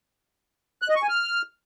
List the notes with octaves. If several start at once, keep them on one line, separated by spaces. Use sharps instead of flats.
F#6
D#5
C#6
G#5
F6